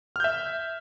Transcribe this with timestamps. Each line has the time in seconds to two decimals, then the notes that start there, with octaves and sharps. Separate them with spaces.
0.16 F6
0.20 G6
0.24 E5